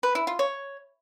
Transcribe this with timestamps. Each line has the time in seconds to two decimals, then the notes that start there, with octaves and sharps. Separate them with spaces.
0.03 B4
0.15 E4
0.27 F4
0.39 C#5